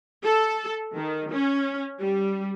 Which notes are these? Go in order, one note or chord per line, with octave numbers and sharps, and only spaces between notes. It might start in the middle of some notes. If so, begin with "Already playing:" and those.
A4
D#3
C#4
G3